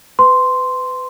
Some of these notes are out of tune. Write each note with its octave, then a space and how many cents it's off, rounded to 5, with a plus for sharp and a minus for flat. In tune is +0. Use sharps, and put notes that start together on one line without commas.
B4 +30 C6 -5